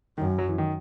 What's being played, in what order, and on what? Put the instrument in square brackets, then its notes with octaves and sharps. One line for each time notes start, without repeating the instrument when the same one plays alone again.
[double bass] F#2 [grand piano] D#3
[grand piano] F#3
E3
D#3